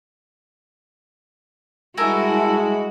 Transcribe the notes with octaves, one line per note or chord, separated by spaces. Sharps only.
G3 G#3 E4 F#4 A4 A#4 G#5